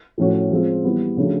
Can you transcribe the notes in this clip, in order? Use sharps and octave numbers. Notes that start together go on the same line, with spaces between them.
A2 F3 A3 C#4 F#4
F3 G#3 C4 F4
E3 G3 B3
C#3 F3 A3 D4 F#4